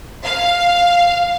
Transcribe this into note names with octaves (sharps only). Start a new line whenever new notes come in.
F5